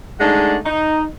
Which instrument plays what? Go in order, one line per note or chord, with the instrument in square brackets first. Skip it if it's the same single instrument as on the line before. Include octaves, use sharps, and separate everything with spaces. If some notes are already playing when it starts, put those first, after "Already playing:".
[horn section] G#3 A3 D4 D#4 F#5
D#4